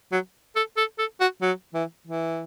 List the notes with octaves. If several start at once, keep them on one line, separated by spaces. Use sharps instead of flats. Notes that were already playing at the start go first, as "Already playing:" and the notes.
F#3
A4
A4
A4
F#4
F#3
E3
E3